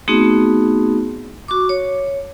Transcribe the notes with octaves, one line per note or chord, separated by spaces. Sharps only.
A3 B3 C4 D#4 F#4 G#4
F#4 C#6 D6
C#5